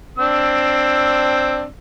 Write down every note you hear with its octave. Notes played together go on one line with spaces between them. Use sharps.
C4 D4 E6